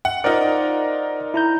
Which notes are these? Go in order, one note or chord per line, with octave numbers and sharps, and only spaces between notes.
F#5
D#4 F4 A#4 C5 D5 F#5
E4 A#5 G6